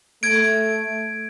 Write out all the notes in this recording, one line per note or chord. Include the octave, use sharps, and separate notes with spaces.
A3 G#6 D7